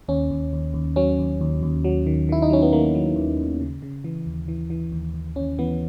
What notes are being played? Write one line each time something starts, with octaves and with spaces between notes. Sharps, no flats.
D#2 C#4
D#2
D#2
D#2
F#3 C#4
D#2
D#2
D#2
F#3
D#3
D#3 E4
D#4
F#3 C#4
B3
D#3 A#3
F#3
D#2
D#2
C#3
C#3
E3
D#2
E3
E3
D#2
D#2
D#2 C#4
E3 B3